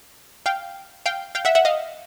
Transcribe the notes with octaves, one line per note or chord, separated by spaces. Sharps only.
F5 G5
F5 G5
F5 G5
E5 F#5
E5 F#5
D#5 F5